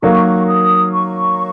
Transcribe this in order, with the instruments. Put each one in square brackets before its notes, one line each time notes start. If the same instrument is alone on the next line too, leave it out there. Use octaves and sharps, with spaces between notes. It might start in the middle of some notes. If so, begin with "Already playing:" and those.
[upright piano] D#3 F#3 A#3 [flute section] C#6
[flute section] D#6
C#6